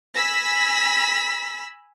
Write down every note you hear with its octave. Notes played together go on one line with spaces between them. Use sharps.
G#5 B5 E6 A#6 B6